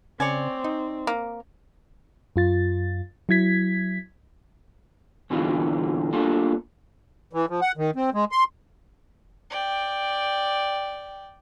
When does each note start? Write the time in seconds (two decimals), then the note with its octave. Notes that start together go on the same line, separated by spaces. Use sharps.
0.20 C#3 C4 C#5 D5 G#5
0.64 D#4
1.07 A#3
2.36 F#2 F4 A6
3.29 F#3 E4 G#6 B6
5.30 A#2 D3 E3 B3 D#4 F4
6.13 A#3 B3 D4 F4 A4
7.33 E3
7.49 F3
7.62 F#5
7.77 D#3
7.96 C4
8.14 G#3
8.32 C6
9.51 D5 G5